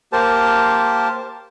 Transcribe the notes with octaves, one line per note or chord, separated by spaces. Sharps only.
A#3 G4 A#4 C5 A5